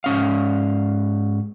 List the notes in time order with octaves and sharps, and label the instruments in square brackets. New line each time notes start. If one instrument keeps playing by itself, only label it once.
[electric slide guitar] G#2 C#4 F5